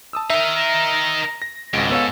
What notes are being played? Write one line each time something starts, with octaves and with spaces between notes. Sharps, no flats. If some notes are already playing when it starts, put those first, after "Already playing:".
A5 D#6 E6
D#4 A#4 E5
A#5
A#6
G#1 C#2 G#2
B3 A4 C#5 F5